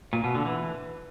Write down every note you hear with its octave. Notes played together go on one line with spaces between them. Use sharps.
A#2
B2
D3
E3